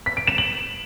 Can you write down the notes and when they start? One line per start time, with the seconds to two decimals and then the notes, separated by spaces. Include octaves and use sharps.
0.06 B6
0.17 D7
0.27 E7
0.38 F#7